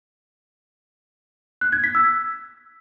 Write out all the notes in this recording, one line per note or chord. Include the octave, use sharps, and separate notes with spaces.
F#6
G#6
B6
E6